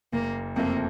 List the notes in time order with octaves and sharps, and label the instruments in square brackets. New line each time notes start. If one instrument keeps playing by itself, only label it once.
[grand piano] F#1 [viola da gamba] A#3
[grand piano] F2 C3 F3 A3 [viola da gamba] A#3